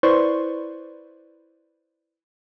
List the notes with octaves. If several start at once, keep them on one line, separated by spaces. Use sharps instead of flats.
E4 B4 C5 D5 C6 C#6